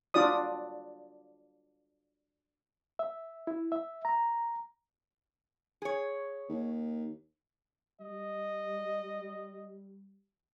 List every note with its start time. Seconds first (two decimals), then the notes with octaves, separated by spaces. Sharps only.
0.14 D4 F4 F#4 D5 D#6
2.99 E5
3.47 E4
3.72 E5
4.05 A#5
5.82 G#4 C#5
6.49 D#2
8.01 G3 D#5